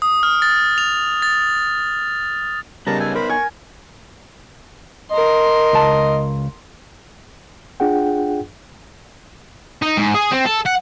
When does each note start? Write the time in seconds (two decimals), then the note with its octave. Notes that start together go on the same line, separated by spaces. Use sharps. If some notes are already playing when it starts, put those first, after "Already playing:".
0.02 D#6
0.23 F6
0.42 A6
0.78 F7
1.22 A6
2.87 C#3 G3 B3 D#4 A#4 A5 A#5
3.00 A4 G#5
3.15 A#4 C5 B5
3.29 G#5 C#6
5.12 A#4 D#5 C6
5.73 C#2 A5
7.80 D4 F4 G#4 F#5 G5
9.82 D#4
9.97 G#2
10.14 G#4
10.31 C4
10.46 A4
10.66 F#5